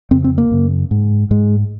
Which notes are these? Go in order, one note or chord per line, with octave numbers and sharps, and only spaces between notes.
F2 C#3 C4
C4
A#3
F#2 C#3
G#2
G#2 G#3